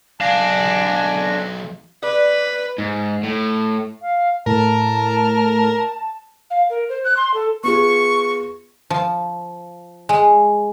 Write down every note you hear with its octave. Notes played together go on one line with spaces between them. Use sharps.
B1 D4 F5 G#5 A#6
B4 D5
G#2
A2
F5
A2 A#4 A5
F5
A#4
C5
F#6
C6
A4
B3 F4 G#4 C#6
F3
G#3